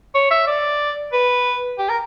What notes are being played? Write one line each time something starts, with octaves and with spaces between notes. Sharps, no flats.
C#5
E5
D5
B4
G4
A#4